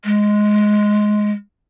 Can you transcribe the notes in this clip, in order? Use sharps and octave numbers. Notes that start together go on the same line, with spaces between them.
G#3